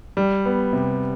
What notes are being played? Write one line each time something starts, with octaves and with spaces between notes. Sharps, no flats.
G3
B3
C3